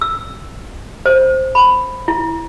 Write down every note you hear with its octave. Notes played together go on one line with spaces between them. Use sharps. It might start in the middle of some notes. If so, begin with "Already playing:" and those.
E6
C5
B5
E4